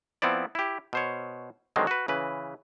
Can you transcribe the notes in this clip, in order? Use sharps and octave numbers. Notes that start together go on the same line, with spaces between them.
F3 B3 C4 E4 D5
E4 G4
B2 C5 C#5
D3 D#3 F#3 G#3 C4
F#4 B4
C#3 E3 B4